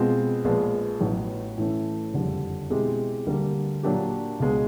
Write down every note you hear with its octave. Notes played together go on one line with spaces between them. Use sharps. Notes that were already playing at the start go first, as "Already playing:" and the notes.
Already playing: B2 G#3 C4 F4
A#1 A#2 F3 G#3 B3
A1 A2 F#3 B3
A2 E3 A3 C#4
F#1 F2 D3 G3
B2 G#3 C4 E4 G4
D2 D3 G3 A#3
A#2 F#3 A#3 D4 G4
C#2 B2 G#3